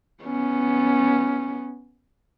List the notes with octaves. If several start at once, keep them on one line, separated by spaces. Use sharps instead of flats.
B3 C#4